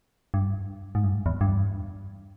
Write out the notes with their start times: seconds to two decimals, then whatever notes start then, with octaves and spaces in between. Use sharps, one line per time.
0.34 G2
0.95 G#2
1.04 G2
1.14 G#2
1.26 E2
1.41 G2